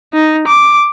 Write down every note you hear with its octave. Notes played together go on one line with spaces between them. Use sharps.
D#4
D6